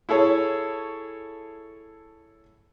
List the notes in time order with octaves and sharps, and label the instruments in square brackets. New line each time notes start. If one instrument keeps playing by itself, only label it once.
[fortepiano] E4 G#4 A4 C#5